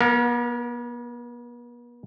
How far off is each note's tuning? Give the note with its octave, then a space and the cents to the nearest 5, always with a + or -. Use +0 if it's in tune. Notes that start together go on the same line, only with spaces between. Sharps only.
B3 -45 A#4 +0